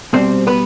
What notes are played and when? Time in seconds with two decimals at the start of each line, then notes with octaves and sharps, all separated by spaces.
0.13 B2 G3 C4 C5
0.47 B3 B4